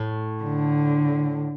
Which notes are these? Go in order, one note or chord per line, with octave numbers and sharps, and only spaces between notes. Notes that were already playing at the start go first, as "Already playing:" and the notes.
Already playing: A2
D3